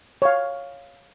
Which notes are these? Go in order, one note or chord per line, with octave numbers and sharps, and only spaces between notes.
C#5 F5